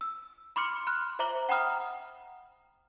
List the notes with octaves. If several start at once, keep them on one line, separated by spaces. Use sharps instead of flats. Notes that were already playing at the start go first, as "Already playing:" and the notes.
E6
B5 C6 D6 F6 C#7
B5 F6 F#6
C5 E5 A#5 D6 F#7 G7
F#5 G5 A#5 B5 D#6 F6